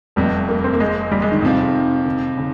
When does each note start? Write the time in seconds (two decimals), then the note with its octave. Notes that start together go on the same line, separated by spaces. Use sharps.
0.16 F1 F2 C3 G3
0.49 A#3
0.64 C4
0.73 A#3
0.80 G#3
1.11 G3
1.22 G#3
1.32 D#3
1.42 F2 C3 F3
2.05 D#3
2.37 C#3